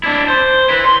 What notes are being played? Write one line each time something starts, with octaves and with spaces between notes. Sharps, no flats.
D4 E4
C5
E4 B4
C6